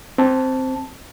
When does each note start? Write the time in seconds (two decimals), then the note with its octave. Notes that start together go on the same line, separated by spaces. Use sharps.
0.18 C4 A5